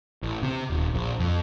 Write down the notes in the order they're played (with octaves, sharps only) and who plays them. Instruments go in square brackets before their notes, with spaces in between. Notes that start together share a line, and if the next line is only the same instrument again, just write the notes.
[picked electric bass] A1
C3
D#1
A#1
F2